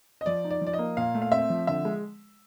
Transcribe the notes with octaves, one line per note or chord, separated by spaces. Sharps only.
D#5
F3 D5
D#4
D5
F3
D5
D#5
A#3
A#2 F5
A3
F5
C4 E5
F3
D3 E5
G#3